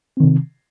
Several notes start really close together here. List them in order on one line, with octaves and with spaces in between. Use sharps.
C4 D#3 C3